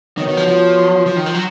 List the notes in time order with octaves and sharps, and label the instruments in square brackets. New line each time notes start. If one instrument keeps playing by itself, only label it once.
[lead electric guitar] D#3 [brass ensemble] B3 F#4 C#5
[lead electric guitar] D#3
F3
F3
F3
D#3
F3
F#3